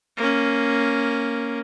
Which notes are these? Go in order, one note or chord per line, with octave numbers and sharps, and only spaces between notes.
A#3 C#4